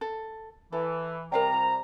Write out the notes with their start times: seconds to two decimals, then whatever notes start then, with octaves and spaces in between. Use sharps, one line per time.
0.01 A4
0.73 E3 A4
1.32 C3 G3 A#4 F5 G5 A#5
1.54 F4